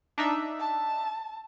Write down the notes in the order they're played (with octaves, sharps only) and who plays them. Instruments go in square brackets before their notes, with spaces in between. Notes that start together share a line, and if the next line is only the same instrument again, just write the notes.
[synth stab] D4 D#4 E5
[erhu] A5